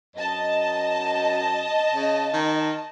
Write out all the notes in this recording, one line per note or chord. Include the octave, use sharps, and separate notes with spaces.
F#2 D#5 A5
C#3
D#3